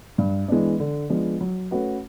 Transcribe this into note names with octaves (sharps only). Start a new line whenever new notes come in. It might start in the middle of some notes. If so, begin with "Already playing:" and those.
G2
E3 G#3 B3 D4
D3
F3 G#3 B3 D4
F#3
A3 C#4 F#4 B4